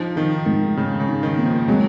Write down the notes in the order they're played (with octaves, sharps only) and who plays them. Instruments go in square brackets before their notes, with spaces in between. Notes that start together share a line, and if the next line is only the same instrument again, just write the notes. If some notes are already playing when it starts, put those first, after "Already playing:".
Already playing: [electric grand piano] F3 [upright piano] D#4
[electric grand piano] D#3 [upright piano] D#4
[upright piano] G#2 [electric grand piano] D#3
[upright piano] G#2 [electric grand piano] C#3
[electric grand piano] C#3
[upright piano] D#4
[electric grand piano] D#3
[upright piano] A#3
[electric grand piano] F3
[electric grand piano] F#3 [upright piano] G#3